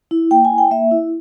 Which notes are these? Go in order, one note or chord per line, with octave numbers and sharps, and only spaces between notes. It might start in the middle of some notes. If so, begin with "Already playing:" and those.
E4
A#3 G5
G#5
E4
G5
A#3 E5
E4